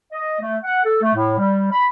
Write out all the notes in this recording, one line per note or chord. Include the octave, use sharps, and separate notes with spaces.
D#5
A3
F#5
A4
A3
A2
G3
B5